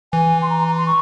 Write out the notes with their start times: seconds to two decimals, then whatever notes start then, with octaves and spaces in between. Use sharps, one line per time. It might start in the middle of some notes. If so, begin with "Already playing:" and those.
0.13 E3 G#5
0.42 C6
0.50 A#5
0.68 A#5
0.77 C6
0.86 C#6